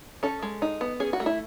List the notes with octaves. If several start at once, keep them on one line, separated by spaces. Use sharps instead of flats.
C#4 A4
G#3
D#4
B3
C#4 G#4
F#4
A3
E4